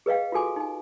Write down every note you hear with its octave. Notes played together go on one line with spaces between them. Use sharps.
G#4 B4 D#5 F5 G5
F4 F#4 A4 G#5 D6
D#4 G#5